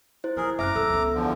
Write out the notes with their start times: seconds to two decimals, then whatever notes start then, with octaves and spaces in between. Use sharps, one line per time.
0.24 E4 C5
0.37 D#3 F#3 G#4 A#4
0.59 F#2 C4 E5 A#5 D6 F6 F#6
0.75 D#1 D#2 A4 E6
0.90 C#2 B3
1.14 E2 D3 F3